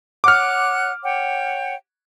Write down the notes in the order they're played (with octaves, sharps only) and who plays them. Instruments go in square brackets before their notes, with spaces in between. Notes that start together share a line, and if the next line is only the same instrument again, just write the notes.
[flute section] C#5 F#5 F#6 [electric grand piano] D6 F6
[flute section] C#5 F#5 G5